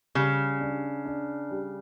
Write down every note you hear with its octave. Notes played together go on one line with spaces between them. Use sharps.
C#3 G3
D4
D4
G3